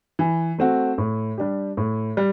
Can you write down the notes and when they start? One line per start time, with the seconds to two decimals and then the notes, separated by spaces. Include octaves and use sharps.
0.19 E3
0.59 A3 C4 F#4
0.98 A2
1.38 G3 D4 G4
1.77 A2
2.17 G3